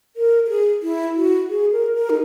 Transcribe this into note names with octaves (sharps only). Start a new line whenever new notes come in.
A#4
A#4
G#4
E4
F#4
G#4
A#4
A#4
D#4